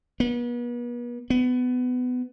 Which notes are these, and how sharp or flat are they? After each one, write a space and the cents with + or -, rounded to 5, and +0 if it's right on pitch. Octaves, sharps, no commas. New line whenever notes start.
B3 -40
B3 +20